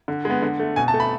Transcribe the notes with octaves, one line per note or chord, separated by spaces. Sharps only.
D3
G#3 B3
D3
A3
B2 G#5
A5
A3
B5